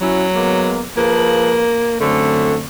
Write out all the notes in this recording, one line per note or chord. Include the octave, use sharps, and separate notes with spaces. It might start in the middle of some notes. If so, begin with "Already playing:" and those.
F#3 C#4 E4 F#4
G#3 A#3 B3
F3 A#3 G#4 B4
F#2 D3 A3 C4